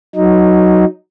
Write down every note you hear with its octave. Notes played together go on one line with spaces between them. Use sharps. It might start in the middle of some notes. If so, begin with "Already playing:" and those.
F#3 D#4